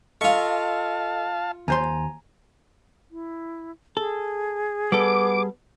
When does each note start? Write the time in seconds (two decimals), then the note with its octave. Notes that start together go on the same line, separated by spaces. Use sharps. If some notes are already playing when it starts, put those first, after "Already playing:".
0.21 F4 A4 D#5 F5 A5 C#6
1.68 D#2 C5 G#5 A#5 C6
3.11 E4
3.97 G#4 A4
4.92 G3 B3 A4 D6